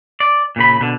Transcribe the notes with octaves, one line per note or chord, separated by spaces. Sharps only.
D5
A#2 C#3 B5
B2 D3